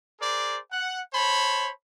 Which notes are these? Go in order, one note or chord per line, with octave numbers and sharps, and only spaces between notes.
G#4 A#4 C5 D5
F#5
C5 C#5 A5 B5